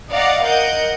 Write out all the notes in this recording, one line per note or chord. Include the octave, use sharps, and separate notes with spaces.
D5 D#5 F5 F#5 A#5
A#4 D#5 F#5 G6